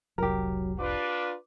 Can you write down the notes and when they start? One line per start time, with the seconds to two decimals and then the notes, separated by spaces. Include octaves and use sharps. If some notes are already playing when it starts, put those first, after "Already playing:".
0.18 F1 C2 F#3 G4 A#4
0.79 D4 F4 B4 D6